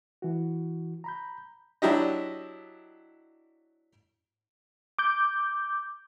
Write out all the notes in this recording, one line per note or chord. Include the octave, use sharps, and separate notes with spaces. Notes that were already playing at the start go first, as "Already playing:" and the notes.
E3 F#4
A#5 B5 G6
F#3 D4 E4 G4 D#5
D6 G6